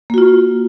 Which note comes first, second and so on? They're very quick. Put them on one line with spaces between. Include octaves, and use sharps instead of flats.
A#3 F#4 F4